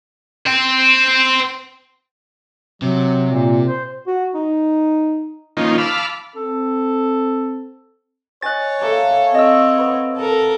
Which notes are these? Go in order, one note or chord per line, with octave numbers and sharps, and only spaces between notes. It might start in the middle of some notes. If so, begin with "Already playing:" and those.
C5 G5
C3 F#3
A#2
C5
F#4
D#4
D#3 F3 A#3 C#4 D#4 F4
F5 A5 B5 D6 E6 F6
C4 A4
C#5 D#5 G#5 F#6 A6
A#3 A4 D5 E5
C4 A4 D#5 F5 E6
B3
A4 A#4